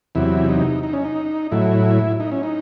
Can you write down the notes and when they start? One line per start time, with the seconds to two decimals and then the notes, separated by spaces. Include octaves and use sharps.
0.15 E2 C3 F#3 E4
0.49 D#4
0.83 D#4
0.93 C#4
1.04 D#4
1.51 A2 F#3 E4
2.20 D#4
2.32 C#4
2.43 D#4